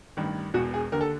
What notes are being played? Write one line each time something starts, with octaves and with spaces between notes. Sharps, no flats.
A1 G2 D#3
E1 E2 B2 F#4
G#4
D#2 D3 A#4
A4